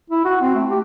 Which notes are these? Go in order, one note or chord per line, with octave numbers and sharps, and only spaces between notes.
E4
F#4
C4
A3
G4